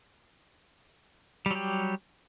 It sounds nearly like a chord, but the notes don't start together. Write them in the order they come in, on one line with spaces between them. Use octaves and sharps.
G3 F#3 G4